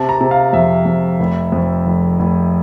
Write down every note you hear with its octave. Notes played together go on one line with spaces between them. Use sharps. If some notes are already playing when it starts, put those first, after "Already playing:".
Already playing: C3 A5
A#5
C3
F5
F2 E5
F2
F1
F2
F1
F1